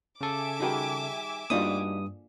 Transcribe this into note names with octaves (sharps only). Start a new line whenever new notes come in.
C#3 A4 E5 G#5 D6
D#3 G3 D#4 F#4 G#4
G2 A3 A#3 D4 D#4 F4 F#4 D#6